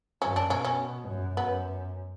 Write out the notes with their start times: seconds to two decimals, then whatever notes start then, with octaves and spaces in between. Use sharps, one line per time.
0.22 F#2 C#4
0.36 D4
0.50 B2 C#4
0.64 C#4
1.09 F#2
1.37 F#2 B3